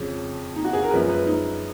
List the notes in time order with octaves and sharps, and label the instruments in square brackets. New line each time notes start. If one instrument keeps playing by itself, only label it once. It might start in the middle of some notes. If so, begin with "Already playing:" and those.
Already playing: [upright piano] F2 C#3 F3 G#3 C#4
D#4
F#4
G#4
A#4
F#2 F3 G#3 B4
B4
D#4